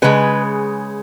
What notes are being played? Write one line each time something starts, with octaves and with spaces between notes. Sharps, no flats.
C#3 G#3 B4